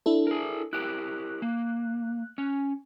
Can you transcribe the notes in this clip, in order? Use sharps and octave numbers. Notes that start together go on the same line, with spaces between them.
D4 E4 A4
G#4 A#4
E4 G4 A#4 F#6
A#3
C#4